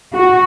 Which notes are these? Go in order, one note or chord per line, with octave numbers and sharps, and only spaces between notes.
F#4